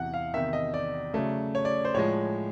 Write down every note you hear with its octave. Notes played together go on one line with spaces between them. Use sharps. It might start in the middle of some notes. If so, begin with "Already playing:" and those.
Already playing: E2 C3 E3 F#5
F5
E2 C3 D#3 E5
D#5
D5
C#3 F#3 A3
C#5
D5
C5
A2 F3 G#3 C#5